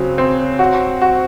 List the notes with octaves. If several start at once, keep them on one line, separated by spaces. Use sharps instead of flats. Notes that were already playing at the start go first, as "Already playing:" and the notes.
Already playing: C#3 F#3 C4
C4
F#4
F#4